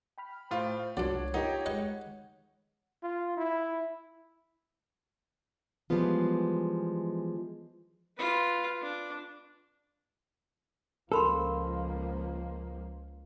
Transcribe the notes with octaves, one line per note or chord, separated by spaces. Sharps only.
G5 B5 F6
A2 F4 C5
C2 A#2 F#3 G#3 D4 C#5
B3 D#4 F4 G4 A#4
G#3 B4 D#5 F#5 C#6
F4
E4
E3 F3 G3 G#3 B3 F4
F4 B4
D4
C#2 F3 A#3 A4 A#4 B5 C6